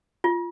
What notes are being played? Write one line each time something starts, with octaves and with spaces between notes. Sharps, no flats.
F4